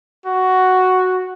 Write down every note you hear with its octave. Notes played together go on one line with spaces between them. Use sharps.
F#4